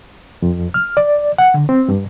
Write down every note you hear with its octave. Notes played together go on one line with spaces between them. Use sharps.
F2
F6
D5
F#5
D3
C4
G2